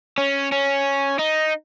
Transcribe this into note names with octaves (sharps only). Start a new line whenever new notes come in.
C#4
C#4
D#4